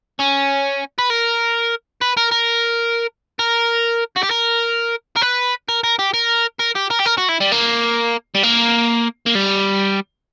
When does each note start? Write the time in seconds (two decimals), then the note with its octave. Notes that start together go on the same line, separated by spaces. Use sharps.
0.19 C#4
0.99 B4
1.10 A#4
2.02 B4
2.17 A#4
2.32 A#4
3.39 A#4
4.17 F#4
4.24 G4
4.31 A#4
5.17 A#4
5.22 B4
5.69 A#4
5.84 A#4
5.99 G4
6.14 A#4
6.60 A#4
6.76 G4
6.91 A#4
7.00 G4
7.06 A#4
7.18 F#4
7.29 E4
7.40 G3
7.52 A#3
8.35 G3
8.43 A#3
9.26 A#3
9.35 G3